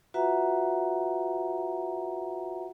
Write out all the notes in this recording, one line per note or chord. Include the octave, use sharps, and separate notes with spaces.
F4 F#4 B4 E5 F#5 A#5